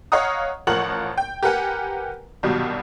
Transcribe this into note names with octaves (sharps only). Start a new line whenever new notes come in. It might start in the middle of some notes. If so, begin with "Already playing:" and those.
C#5 D#5 F5 F#5 A#5 D#6
A1 F3 A#4 F#5 C#6 F#7
G5
G4 A#4 B4 F#5 G#5
C2 G2 B2 D#3 F#3 G3